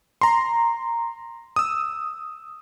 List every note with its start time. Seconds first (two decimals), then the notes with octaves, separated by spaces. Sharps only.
0.21 A#5 C6
1.56 D#6 E6